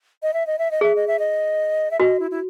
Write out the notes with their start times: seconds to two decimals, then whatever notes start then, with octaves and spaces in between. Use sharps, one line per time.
0.23 D#5
0.34 E5
0.47 D#5
0.59 E5
0.71 D#5
0.81 G#4 E5
0.96 D#5
1.07 E5
1.19 D#5
1.91 E5
2.00 F#4 D#5
2.20 E4
2.31 E4